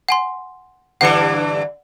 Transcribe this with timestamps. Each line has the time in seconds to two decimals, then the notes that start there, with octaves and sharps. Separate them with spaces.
0.09 F#5 G#5 C6
1.01 G2 D3 E3 F#5 C#7